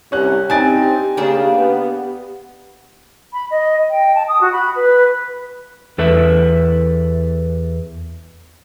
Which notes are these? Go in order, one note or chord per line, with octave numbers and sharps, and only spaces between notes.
C2 C#4 G4 F#6
C4 D4 D#4 G#5 A6 D7
C#3 A#3 D4 G#4
B3
B5
D#5
G5
A5
D#6
F#4
B5
B4
E2 A4 B4 E5